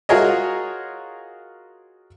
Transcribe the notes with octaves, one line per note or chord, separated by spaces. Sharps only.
F4 F#4 G#4 A#4 C#5 D#5